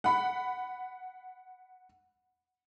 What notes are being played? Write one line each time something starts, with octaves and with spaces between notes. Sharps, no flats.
F#5 B5